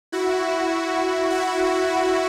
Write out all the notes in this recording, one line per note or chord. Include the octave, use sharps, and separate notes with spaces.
E4 F#4
E4 F#4